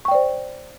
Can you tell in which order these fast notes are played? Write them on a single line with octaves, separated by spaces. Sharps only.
C#6 G5 D5 C5